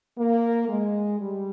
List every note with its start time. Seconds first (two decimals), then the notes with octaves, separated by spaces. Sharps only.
0.17 A#3
0.68 G#3
1.20 G3